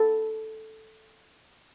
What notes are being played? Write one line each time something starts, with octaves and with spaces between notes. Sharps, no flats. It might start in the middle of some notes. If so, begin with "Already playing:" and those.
Already playing: A4